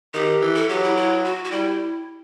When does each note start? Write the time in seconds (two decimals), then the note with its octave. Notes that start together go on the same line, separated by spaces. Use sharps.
0.14 D#3 G4
0.42 E3
0.55 A4
0.69 F#3 G4
0.83 E4
0.97 E4
1.24 F#4
1.44 F#4
1.51 G3 E4